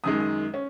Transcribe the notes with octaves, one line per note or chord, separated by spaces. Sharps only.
F#2 D#3 G#3 D#6
D#6
C#4